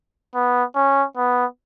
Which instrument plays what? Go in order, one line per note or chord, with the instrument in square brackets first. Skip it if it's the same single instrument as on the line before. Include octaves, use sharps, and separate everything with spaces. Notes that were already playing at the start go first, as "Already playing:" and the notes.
[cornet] B3
C#4
B3